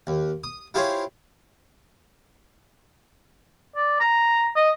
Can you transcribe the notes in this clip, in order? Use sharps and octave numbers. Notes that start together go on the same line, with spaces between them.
D#2
D#6
E4 F4 G4 G#4 C5 C#5
D5
A#5
D#5